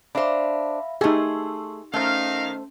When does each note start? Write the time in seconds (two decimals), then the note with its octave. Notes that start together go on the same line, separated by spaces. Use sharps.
0.15 D4 C5 E5 F5 B5
1.01 A3 D#4 G4 G#4 C6 C#6 E6
1.94 D#3 A3 C#4 C5 F5